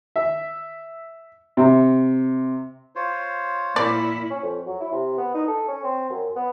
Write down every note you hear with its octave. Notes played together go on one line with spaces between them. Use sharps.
E5
C3
F4 C5 C#5
A#2 E4 D5
C#4
F2
F#3
E4
C3
B3
D#4
A4
C#4
C4
F#2
B3